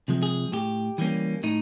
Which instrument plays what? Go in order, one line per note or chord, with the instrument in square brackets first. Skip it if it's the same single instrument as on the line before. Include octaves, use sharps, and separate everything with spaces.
[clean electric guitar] C3 F3 G#3
G#4
A2 G4
E3 G3 A#3 C#4
A2 D#4